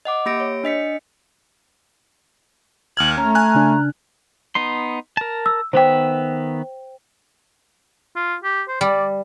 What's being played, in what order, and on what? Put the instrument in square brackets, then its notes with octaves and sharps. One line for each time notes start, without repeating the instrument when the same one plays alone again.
[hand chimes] D#5 F#5 D6
A#3 G4 A#6 D7
C#5
D4 D#5 B6 C#7
[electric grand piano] D#2 F6 G#6 [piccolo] F#7
[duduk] A3 [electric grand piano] C#4 [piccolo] A#5
[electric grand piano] G#5 F#6
[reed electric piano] C#3 D4
[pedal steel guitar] B3 D#4 C6
A#4 A5
[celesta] E6
[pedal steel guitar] D#3 B3 E5 [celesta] C5 G5
[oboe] F4
G4
C5
[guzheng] G3 [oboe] D5